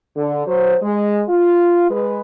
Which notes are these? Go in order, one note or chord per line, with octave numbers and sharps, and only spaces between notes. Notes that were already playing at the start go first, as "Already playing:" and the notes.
D3
F#3 C5
G#3
F4
G#3 B4